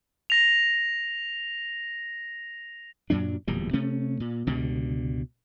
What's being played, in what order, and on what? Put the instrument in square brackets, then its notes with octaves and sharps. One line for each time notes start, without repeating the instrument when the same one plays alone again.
[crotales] A#6 F7
[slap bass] F#2 A#2 F#3 D4
D1 E2 A#2 G3
C3 A3 C#4
A#2
C#2 G2 B2 D3